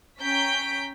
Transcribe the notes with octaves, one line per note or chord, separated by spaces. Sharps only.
C#4 G5 A#5 G6 B6 D7